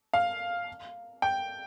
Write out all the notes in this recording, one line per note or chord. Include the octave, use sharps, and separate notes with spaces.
F5
G5